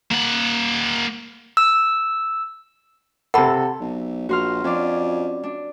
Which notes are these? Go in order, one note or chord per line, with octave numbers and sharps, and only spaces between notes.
A#3 F#5
E6
C3 A4 F#5 B5
B1
A#1 F#4 C6 F6
F2 C#4 D4 D5
D4